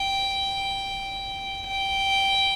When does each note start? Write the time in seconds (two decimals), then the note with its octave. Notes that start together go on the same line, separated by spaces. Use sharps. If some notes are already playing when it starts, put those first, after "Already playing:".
Already playing: G5
1.66 G5